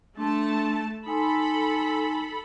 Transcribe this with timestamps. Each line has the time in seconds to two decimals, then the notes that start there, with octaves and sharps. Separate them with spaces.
0.17 A3 D4 A5 C6
1.06 D#4 A4 G#5 B5 C6